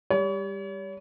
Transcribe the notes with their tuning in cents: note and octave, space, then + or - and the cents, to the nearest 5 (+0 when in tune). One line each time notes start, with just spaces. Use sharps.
G3 +20 C#5 +40